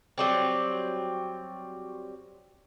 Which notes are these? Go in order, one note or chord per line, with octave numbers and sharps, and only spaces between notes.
F#3 G3 C4